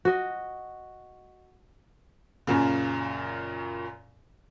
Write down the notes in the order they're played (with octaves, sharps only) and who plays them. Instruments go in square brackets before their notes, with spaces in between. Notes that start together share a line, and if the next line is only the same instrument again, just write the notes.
[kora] F#4 D#5
[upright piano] F#2 A#2 C#3